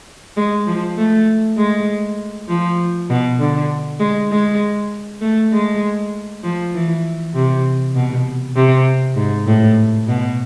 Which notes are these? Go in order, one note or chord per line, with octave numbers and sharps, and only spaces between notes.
G#3
F3
A3
G#3
F3
B2
D3
G#3
G#3
A3
G#3
F3
E3
C3
B2
C3
G#2
A2
B2